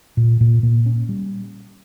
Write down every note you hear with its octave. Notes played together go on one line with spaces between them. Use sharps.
A#2
A#2
A#2
C#4
G3